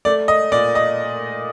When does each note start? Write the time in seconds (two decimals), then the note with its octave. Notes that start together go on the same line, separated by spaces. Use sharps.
0.05 A3 D5
0.28 D#5
0.52 A#2 D5
0.75 D#5